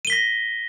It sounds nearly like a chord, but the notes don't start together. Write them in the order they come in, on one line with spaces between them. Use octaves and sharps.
D#7 G7 B6 A#6